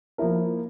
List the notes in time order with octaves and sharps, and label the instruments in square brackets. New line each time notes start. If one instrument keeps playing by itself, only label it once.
[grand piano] F3 A#3 E4 A#4